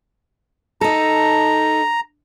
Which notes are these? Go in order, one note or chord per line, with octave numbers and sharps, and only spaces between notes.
D#4 A4 A#5